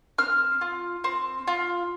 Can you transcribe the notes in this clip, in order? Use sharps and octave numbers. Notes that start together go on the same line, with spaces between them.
C4 F6
F4
C4
F4